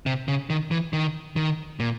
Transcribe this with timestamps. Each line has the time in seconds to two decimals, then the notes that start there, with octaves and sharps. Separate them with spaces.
0.06 C3
0.28 C#3
0.50 D#3
0.71 E3
0.93 D#3
1.36 D#3
1.80 A#2